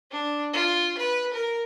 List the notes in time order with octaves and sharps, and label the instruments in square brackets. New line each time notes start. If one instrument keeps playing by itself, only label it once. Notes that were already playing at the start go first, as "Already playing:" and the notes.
[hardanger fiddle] D4
F4
B4
A#4